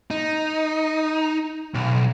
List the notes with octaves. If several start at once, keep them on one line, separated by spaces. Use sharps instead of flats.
D#4
B1